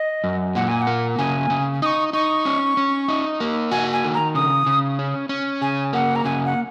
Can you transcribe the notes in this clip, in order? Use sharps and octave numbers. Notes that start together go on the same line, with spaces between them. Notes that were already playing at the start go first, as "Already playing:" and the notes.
Already playing: D#5
F#2
A#2 F#5
G#5
F#5
A#3
C#3 G#5
C#3
D#4 C#6 D#6
D#4 C#6
C#4
C#4
D#4
A#3
F#4 G#5
G#5
D#3
A#5
C#3 D#6
C#3
C#4
C#4
C#3 G#5
A#3 F#5
A#5
C#3 G#5
F#5